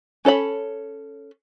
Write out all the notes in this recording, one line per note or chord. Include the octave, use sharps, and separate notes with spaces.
C#4 A4 C#5 B5